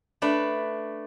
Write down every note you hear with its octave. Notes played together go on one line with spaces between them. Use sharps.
A3 D4 B4